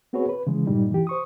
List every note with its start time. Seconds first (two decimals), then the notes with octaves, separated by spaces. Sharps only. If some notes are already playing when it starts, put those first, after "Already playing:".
0.13 B3 C4 F#4 G#4 B4 C#5
0.29 B4
0.47 C#3 E3 G#3
0.67 G2 A#2 G3 D#4
0.91 E3 G4
1.07 C5 C#6 D#6